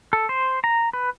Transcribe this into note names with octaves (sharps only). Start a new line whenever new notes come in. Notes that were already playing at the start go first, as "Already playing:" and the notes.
A4
C5
A#5
B4